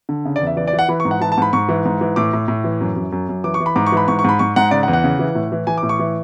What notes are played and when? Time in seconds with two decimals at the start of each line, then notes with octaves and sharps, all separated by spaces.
0.09 D3
0.25 C#3
0.36 D5
0.41 E2
0.47 E5
0.57 E3 D5
0.67 D5
0.73 E3
0.79 F#5
0.89 E3 B5
1.00 C#6
1.05 G#2
1.11 F#5
1.20 E3 A5
1.32 A5
1.38 G#2 B5
1.53 G#2 C#6
1.69 E3
1.85 G#2
2.01 E3
2.16 A2 D6
2.33 A2
2.48 A2
2.64 E3
2.81 F#2
2.96 F#2
3.12 F#2
3.29 F#2
3.44 E3 D6
3.54 C#6
3.60 E3
3.66 B5
3.76 G#2 D6
3.86 C#6
3.92 E3 B5
4.08 G#2 C#6
4.19 C#6
4.24 G#2 B5
4.39 G#2 C#6
4.56 G#2 F#5
4.71 C#3 D5
4.83 F#5
4.88 E2
4.93 F#5
5.04 C#3
5.19 E3
5.35 A2
5.52 E3
5.67 E3 G#5
5.78 D6
5.83 A2
5.89 C#6
5.99 E3